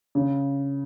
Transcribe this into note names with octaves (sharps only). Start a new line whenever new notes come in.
C#3